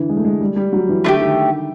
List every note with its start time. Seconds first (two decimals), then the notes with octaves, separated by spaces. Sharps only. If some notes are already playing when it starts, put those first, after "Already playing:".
Already playing: D3 E3
0.09 G#3
0.17 A3
0.25 G#3
0.40 G3
0.56 G3
0.73 F#3
0.89 E3
1.04 D3 A3 D4 G4
1.21 D#3